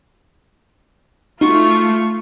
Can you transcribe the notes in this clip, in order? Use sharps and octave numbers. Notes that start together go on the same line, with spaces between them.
A3 D#4 F4 F#4 C#6